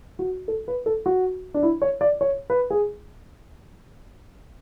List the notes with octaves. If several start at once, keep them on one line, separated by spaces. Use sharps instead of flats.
F#4
A4
B4
A4
F#4
D4
E4
C#5
D5
C#5
B4
G#4